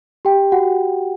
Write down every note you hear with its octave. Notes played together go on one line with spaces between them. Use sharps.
G4 G5
F#4 F#5